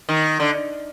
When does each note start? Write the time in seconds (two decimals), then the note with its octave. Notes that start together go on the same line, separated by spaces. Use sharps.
0.09 D#3
0.40 D3